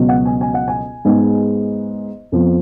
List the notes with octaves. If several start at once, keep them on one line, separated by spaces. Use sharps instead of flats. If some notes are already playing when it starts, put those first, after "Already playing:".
Already playing: C#2 B2 F#3 B3
F#5
G#5
G#5
F#5
G#5
G#2 G#3 B3
F2 F3 B3